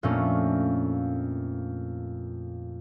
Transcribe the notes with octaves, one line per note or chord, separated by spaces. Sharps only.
F2 A#2 A3 A#3 C#4 D4